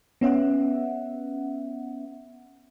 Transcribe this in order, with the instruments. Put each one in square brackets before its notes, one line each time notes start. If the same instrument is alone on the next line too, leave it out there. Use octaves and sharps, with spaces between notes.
[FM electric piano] B3 C#4 E5 F#5